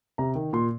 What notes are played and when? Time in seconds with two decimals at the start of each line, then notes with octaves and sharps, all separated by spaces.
0.18 C3 A#5
0.35 D#3
0.53 A#2 C6